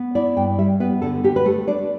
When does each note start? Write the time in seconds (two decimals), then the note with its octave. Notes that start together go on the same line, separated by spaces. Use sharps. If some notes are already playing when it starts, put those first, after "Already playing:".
Already playing: B3
0.15 E4 D5
0.36 G2 G5
0.58 G3 E5
0.80 B3 B4
1.02 D3 A4
1.23 D3 G4
1.36 B4
1.45 A3 A4
1.67 D4 D5